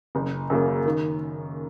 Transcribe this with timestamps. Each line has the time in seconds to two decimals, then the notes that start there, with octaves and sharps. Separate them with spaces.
0.15 F#1
0.50 F#2 C#3 A#3
0.86 D#3